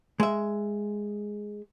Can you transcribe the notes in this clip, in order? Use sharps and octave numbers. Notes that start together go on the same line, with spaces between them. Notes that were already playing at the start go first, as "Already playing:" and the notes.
G#3 E5